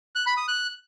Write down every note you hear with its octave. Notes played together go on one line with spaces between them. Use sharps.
F#6
B5
D#6
F#6